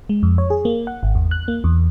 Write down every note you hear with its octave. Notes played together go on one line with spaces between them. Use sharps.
G#3
F2
C#5
G#4
A#3
F#5
G#1
E2
F#6
A#3
E2